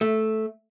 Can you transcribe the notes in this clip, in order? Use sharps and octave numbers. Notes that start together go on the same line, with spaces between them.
A3